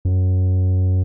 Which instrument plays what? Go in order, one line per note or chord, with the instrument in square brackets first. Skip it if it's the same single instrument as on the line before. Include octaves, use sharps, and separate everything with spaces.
[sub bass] F#2